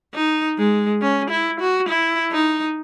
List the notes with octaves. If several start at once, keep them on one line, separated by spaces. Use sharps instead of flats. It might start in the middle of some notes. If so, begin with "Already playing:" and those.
D#4
G#3
C#4
E4
F#4
E4
D#4